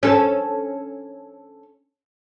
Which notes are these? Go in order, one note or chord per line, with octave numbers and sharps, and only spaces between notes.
C#4 A4